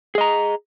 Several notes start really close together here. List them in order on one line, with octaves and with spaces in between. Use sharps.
G#4 D#5 A#5